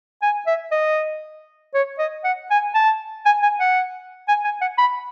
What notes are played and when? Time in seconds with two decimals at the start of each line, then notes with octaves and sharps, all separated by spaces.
0.22 G#5
0.47 E5
0.72 D#5
1.74 C#5
1.98 D#5
2.24 F#5
2.50 G#5
2.74 A5
3.25 G#5
3.42 G#5
3.60 F#5
4.28 G#5
4.44 G#5
4.61 F#5
4.78 B5